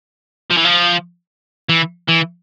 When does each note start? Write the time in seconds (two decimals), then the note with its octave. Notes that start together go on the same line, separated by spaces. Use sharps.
0.50 F3
0.57 E3
0.65 F3
1.69 E3
2.09 E3